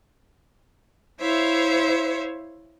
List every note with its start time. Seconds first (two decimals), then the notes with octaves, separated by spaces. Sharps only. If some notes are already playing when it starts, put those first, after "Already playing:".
1.21 E4 C5 C#5 E5 F5